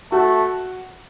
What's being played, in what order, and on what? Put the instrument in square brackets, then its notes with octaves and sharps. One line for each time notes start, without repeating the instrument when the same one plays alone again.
[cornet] A3 [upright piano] F#4